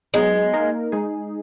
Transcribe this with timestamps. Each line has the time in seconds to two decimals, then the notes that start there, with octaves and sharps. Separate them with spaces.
0.14 F#3 G#3 B3 D#4 G#4
0.53 A#3 D#4 A#4
0.92 G#3 D#4 G#4